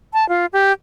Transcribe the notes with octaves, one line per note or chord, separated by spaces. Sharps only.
A5
F4
G4